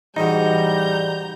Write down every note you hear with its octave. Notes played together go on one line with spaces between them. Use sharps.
A1 G#2 G3 G#3 D#4 F#4 A#5 G6